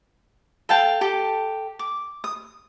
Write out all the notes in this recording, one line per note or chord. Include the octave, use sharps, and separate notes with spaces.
A4 F5 G5 A5
G4 A4 G5
D6
D#6